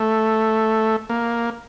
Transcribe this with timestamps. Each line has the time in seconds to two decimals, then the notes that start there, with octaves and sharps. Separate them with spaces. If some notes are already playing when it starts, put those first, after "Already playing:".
Already playing: A3
1.10 A#3